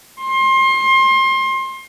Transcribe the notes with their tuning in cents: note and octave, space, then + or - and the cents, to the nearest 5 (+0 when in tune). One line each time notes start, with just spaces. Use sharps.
C6 +30